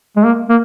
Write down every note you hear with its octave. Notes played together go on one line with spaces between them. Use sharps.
G#3
A#3
A#3